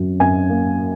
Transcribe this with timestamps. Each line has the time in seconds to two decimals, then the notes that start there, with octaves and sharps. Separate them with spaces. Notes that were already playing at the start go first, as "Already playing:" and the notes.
Already playing: F#2 F#3
0.20 F#2 G#5
0.49 A#3